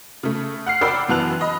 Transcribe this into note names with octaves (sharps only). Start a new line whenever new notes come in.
C#3 A3
F#5 F6 C7
A#4 D5 F#5 G5 B5 E6
F#2 E3 B3 A5 F#6 F7
D#5 B5